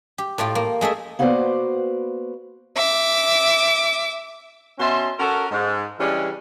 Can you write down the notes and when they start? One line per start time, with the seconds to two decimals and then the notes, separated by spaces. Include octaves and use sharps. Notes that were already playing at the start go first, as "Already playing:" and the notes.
0.18 G4
0.38 A2 A3 F4 G5
0.55 A#3
0.81 G#3 A3 G#4 E5
1.19 A#3 B3 F#4 B4 C5 D5
2.76 E5 D6
4.79 B2 C#4 E5 A5 C6
5.19 C#4 F#4 A4 A#4
5.51 G#2
5.99 C#3 E3 G3 G#3 C#4 D4